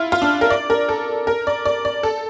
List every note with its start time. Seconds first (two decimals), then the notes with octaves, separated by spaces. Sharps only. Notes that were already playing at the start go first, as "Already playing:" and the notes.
Already playing: E4 F4
0.12 F4
0.22 D4
0.41 A#4
0.50 D5
0.70 A#4
0.89 A4
1.27 A#4
1.47 D5
1.66 D5
1.85 D5
2.03 A4